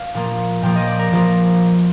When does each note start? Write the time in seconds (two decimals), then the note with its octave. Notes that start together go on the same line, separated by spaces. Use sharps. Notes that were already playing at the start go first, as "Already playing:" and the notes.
Already playing: F5
0.14 A#2 F3 A#3
0.62 A#2 F3 A#3 G5
0.75 D#5
0.87 D5
0.99 A#4
1.11 A#2 F3 A#3